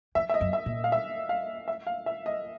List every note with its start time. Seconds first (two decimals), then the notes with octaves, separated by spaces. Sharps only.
0.15 F2 E5
0.29 E5
0.34 D#5
0.41 F#2
0.53 E5
0.66 A#2
0.84 F5
0.92 E5
1.29 F5
1.68 E5
1.87 F5
2.06 E5
2.26 D#5